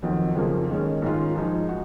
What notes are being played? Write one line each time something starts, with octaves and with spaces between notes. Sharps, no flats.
F2 D#3 F#3
F2 C#3 F3 A#3
D#3 G#3 C#4
G#2 D#3 G#3 C#4 F4
F3 G#3 D#4 G#4
F#4